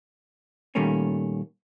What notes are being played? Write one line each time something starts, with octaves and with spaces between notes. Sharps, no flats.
A#2 D#3 G3 A3 A#3 C#4